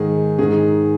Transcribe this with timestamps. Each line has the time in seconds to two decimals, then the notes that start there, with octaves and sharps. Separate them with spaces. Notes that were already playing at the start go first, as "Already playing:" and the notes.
Already playing: G#2 D#3 G#4
0.39 G#2 D#3 G#4